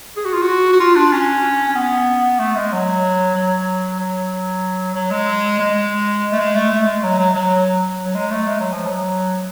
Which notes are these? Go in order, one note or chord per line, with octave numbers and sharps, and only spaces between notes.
G#4
F#4
F4
F#4
F#4
F4
D4
C#4
C#4
B3
A3
G#3
F#3
F#3
F#3
F#3
G#3
G#3
A3
G#3
A3
A3
G#3
F#3
F#3
F#3
F#3
G#3
A3
G#3
F#3
F3
F#3